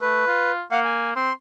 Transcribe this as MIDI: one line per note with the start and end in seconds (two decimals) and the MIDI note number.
0.01 0.24 57
0.01 0.52 71
0.27 0.62 65
0.71 1.15 58
0.71 0.80 77
0.71 0.80 78
0.84 1.10 80
1.16 1.30 60
1.16 1.33 84